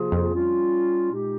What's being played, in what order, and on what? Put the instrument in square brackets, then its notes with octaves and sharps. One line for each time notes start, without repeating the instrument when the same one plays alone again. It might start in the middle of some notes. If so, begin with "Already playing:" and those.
Already playing: [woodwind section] C3 F3 A#3 F4 G#4
[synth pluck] F2
[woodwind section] G3 C#4 F4
A#2 G#3 D#4 G4